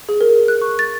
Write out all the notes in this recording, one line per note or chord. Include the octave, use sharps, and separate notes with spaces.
G#4
A#4
F#6
C#6
A6